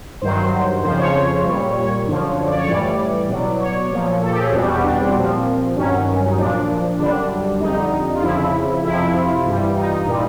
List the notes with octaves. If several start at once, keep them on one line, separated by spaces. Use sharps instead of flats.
G2 D#3 F#3 C5
F2 C#3 F3 C5
C#5
A#2 G3
C#5
F#2 D3 F3
D5
C#5
A2 E3 G3 D5
B2 F#3
C#5
A#2 F3
A4
G4
G#4
E2 B2 G3 F#4
G4
D4
C4
A#2 F3
G2 D#3 F#3 C#4
D#4
A#2 F3 D4
F#2 D3 G3 D4
F2 D3 G3 D#4
F4
F2 C#3 F3 E4
F2 C3 F3 E4
F4
G2 E3 G3
D#4
A#2 G3